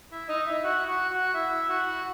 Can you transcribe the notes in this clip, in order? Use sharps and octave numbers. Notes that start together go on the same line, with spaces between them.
E4 E5
D#4 D#5
E4 E5
F#4 F#5
F#4 F#5
F#4 F#5
E4 E5
F#4 F#5